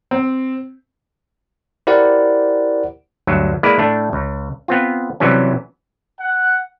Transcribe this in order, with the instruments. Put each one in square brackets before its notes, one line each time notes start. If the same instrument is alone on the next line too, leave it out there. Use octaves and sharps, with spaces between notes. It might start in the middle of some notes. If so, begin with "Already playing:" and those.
[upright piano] C4
[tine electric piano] E4 G4 A#4 C5 D5 F#5
[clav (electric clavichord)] D2 G2 F#3
G#3 A#3 E4 B4 D5
A2 A3 D4
C#2
B3 C4 F4
C3 E3 F#3 G3 C#4
[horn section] F#5